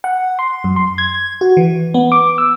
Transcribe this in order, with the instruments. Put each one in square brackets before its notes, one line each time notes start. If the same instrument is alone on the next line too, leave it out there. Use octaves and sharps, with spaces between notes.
[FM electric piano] F#5
C6
F#2
C6
G#6
F#4
E3
B3
D6
E6